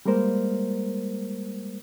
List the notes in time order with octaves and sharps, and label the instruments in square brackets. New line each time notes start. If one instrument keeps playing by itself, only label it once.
[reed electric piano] G3 G#3 A#3 A#4 C5